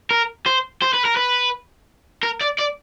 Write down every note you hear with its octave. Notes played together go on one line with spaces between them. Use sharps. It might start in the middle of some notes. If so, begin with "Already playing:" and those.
A#4
C5
C5
B4
A#4
B4
A#4
D5
D5